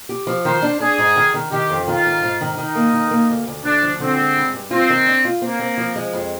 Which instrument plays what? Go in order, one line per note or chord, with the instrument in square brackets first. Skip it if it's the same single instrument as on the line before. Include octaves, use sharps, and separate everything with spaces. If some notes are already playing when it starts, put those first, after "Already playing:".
[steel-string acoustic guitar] G4
F3
[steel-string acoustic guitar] D#3 [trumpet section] C5
[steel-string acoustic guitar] D4
[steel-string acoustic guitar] D4 [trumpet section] G#4
[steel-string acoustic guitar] G#2
D#3
D#3
[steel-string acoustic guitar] D#3 [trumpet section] G4
[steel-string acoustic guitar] F2
[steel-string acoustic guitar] D#3 [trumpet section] F4
[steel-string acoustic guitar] G#2
G#2
D#3
[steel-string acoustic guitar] D#3 [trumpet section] D#4
[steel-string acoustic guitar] A#3
D#3
A#3
D2
D2
[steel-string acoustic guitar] D2 [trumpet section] D4
[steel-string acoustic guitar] F3
[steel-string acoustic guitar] D3 [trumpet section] C4
[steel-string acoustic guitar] G#3
G2
G2
[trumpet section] C4 [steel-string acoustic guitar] F4
[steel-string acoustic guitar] D#3
D4
F4
[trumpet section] A#3 [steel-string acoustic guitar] C4
[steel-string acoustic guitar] C4
F3
G#3
F2